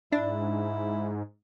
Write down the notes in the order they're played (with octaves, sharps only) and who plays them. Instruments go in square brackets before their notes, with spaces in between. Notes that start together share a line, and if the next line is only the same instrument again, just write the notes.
[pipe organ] G#2 [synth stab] D4 [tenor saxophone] E4